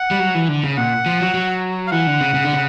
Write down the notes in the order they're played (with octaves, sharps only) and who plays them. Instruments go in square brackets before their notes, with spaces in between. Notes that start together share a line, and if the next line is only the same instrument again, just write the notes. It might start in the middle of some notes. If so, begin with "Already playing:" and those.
Already playing: [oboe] F#5
[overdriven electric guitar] G3
F#3
E3
D3
C#3
[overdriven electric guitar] A#2 [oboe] F#5
[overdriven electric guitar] F3
F#3
F#3
[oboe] F5
[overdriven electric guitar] E3 [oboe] F#5
[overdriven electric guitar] D3
C#3
C#3
D3
C#3